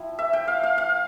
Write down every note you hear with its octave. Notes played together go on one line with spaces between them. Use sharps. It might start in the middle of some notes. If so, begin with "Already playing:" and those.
Already playing: F3 C4 E4
E5
G5
F5
F5
F5